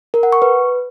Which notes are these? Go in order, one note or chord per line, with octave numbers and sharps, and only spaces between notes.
A#4
F#5
C#6
B4